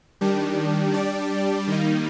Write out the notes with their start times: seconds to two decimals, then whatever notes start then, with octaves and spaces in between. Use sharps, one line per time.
0.21 D#3 G3 D4 G4
0.94 G3 D4 G4 D5
1.67 D#3 G3 A#3 D#4